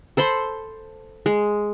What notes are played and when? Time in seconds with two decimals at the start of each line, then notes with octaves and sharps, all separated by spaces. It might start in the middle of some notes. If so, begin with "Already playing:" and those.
0.17 A4 C5 B5 C6
1.26 G#3